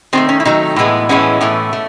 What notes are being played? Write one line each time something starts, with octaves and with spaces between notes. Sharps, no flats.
D#3 F#3 A3 C4
C#4
E4
D#3 F#3 A3 D#4
A2 E3 G#3 B3
A2 E3 G#3 B3 C#4
A2 E3 A3
A3